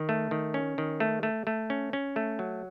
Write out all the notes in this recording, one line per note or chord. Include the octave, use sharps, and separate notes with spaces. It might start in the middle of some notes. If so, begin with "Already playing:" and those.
Already playing: D#3
A3
D#3
C#4
D#3
A3
A3
A3
C#4
C#4
A3
F#3